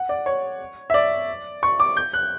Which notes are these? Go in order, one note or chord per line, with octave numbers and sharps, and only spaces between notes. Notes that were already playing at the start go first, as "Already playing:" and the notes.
Already playing: F#5
D5
C#5
E5
D5
C#6
D6
G6
F#6